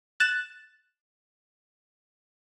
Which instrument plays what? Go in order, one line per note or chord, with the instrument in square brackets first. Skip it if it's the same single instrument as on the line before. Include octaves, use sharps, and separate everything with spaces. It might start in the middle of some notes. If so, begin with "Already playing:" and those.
[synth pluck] F#6 A6 E7